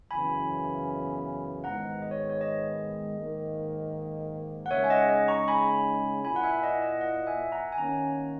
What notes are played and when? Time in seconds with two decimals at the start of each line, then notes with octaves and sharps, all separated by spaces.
0.11 F#2 C#3 E3 B3 G#5 B5
1.64 G#2 D#3 G#3 B3 F#5 A#5
2.02 D#5
2.11 C#5
2.30 C#5
2.41 D#5
3.17 G#2 D#3 A#3
4.66 F#5
4.71 C#3 G#3 D#4 C#5 E5
4.84 G#5
4.90 D#5 F#5
5.10 D#5
5.28 A#5 C#6
5.48 G#5 B5
6.25 A#2 A#3 E4 G#5 B5
6.36 F#5
6.43 E5 G#5
6.63 D#5 F#5
6.82 D#5
7.01 D#5 F#5
7.27 E5 G#5
7.52 F#5 A#5
7.72 G#5
7.77 D#3 A#3 C#4 F#5 A#5